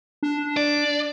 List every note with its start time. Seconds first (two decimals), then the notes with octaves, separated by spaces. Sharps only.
0.23 D4
0.57 D5